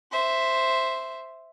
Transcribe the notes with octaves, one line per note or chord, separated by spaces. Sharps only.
C5 E5